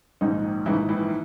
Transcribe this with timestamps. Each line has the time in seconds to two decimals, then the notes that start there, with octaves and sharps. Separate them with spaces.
0.21 A#1 G#2 D#3 D#4
0.66 A#1 G#2 D#3 E3 E4
0.89 E3 E4